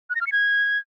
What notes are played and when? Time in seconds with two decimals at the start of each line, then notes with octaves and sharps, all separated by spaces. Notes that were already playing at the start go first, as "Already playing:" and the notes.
0.10 F#6
0.15 A#6
0.21 F6
0.27 C#7
0.32 G#6